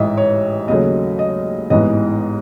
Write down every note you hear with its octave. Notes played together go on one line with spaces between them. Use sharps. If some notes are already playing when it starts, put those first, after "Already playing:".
Already playing: A1 G#2 E3 D#5 E5
C#5
D#2 C#3 F#3 A3 D#5
D#5
A1 G#2 E3 B3 D#5